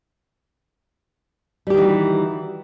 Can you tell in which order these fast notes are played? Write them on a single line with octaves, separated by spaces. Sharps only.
G3 G4 D#3 E3 F#4